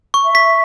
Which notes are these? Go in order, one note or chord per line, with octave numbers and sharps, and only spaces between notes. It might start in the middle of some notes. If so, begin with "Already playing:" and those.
C#6
E5
B6